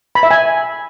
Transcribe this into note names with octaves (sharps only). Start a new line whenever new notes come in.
B5
E5
G#5